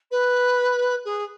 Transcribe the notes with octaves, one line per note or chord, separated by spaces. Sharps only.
B4
G#4